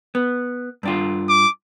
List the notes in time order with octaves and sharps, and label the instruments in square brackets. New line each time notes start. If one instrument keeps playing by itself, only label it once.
[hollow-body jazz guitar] B3
G2 D4 F4
[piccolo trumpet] D6